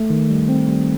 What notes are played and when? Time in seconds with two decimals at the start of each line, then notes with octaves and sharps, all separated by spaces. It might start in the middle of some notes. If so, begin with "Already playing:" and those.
Already playing: A3
0.10 D#3
0.30 G3
0.49 C4
0.69 G3